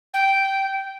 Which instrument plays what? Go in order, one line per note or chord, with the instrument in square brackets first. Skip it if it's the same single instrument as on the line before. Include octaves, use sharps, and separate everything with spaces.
[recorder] G5